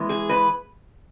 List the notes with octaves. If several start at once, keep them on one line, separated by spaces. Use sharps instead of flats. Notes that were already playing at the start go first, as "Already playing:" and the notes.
Already playing: E3 G#3 B3
G#4
B4